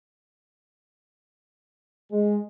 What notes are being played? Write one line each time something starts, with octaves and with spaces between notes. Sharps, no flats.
G#3